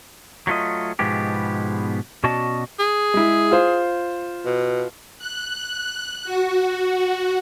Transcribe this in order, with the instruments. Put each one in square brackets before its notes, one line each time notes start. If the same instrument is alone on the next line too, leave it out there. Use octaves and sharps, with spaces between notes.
[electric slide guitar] F#3 A3 F4 D#5
G#2 B2 F3 G#3 B3 G4
B2 C#4 F#4 D5 D#5 A5
[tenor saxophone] G#4
[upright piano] G#3 E4
F4 C5
[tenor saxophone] B2
[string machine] F#6
F#4